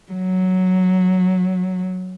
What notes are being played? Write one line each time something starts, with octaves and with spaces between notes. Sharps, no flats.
F#3